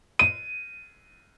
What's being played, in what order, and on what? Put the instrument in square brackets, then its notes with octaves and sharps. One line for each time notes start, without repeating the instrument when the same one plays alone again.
[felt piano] D#7